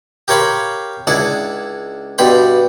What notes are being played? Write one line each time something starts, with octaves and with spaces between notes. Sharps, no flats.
G4 A#4 C#5 F5 B5 C6
C#2 D4 E4 G#4 F#5
G2 B2 G4 B5 C6